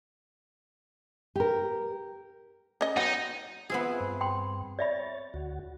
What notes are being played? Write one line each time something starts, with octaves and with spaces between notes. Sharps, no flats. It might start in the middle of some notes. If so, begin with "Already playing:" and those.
G4 A#4
C#4 D#5
F#3 B3 C4 D#4
B3 C4 F4 G#4 E5
G2
G5 B5 C6
C#5 D5 E5 B5 A6
D2 F#4